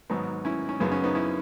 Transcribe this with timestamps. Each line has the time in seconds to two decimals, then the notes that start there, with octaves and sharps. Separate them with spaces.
0.10 G#1 G#2 F#3 B3 D#4
0.45 C#4 E4
0.69 C#4
0.80 F#2 C#3 F#3 B3
0.92 C#4
1.04 B3 D#4
1.15 C#4 E4